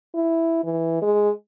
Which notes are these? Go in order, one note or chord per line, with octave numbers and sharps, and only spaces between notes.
E4
E3
G#3